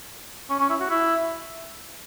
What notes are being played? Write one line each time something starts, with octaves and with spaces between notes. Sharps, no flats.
C#4
C#4
E4
F#4
E4